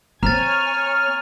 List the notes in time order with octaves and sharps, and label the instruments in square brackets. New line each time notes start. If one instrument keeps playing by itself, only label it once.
[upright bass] C4 [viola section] C#5 G#5 [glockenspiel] A#5 A6 [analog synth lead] F6